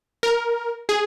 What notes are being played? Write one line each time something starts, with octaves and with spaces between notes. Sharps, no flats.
A#4
G#4